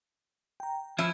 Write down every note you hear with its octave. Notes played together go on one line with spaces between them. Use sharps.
G5 A#5
F3 C#4 E4 E5